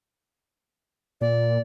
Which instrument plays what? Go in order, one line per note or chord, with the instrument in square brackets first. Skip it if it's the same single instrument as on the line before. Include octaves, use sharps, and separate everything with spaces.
[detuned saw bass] A#2 [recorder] D5